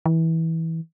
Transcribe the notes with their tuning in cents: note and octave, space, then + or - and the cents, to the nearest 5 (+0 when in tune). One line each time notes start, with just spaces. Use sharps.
E3 -20